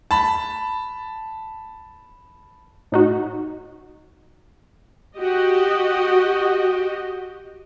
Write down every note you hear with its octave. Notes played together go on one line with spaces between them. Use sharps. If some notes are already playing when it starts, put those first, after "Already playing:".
A5 B5
A2 D#4 F#4
F#4 G4 D#5